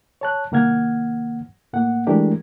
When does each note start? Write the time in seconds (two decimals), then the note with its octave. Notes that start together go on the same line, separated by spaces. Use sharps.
0.21 C#5 A5 F#6
0.52 C2 D#3 A#3 F#5 F6 G#6
1.73 A2 A#3 F#5
2.07 E3 G#3 A3 D4 G4 A#4